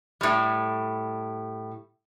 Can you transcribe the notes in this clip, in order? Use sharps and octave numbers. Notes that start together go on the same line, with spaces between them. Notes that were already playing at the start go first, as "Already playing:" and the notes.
A2 G3